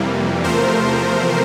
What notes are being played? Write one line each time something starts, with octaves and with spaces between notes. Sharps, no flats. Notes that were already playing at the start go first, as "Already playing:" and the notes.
Already playing: F2 C3 E3 G3 A#3
E2 C3 F3 A3 A#4 C5